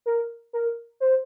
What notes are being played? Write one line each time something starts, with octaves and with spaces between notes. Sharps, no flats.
A#4
A#4
C5